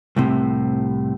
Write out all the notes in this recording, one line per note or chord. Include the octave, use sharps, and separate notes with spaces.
C2 A2 C3